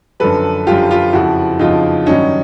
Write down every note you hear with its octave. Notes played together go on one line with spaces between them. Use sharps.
F#2 D3 F3 A4 B4
F#2 D3 F3 F4 G4
F4 G4
F2 C#3 F3 E4 F#4
F2 C#3 F3 D#4 F4
G2 D#3 F#3 C#4 D#4